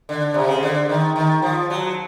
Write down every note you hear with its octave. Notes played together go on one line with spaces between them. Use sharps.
D3
C3
C#3
D3
D#3
D#3
F3
F#3